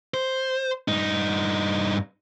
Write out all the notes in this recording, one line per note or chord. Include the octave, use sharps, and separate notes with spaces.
C5
G2 D#4